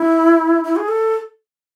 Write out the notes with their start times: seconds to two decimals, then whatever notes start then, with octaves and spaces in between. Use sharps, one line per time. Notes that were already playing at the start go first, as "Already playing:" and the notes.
Already playing: E4
0.64 E4
0.76 G#4
0.88 A4